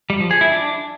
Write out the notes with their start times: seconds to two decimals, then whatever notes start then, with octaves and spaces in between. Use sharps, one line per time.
0.10 G3
0.20 F3
0.31 G#4
0.41 E4
0.52 D4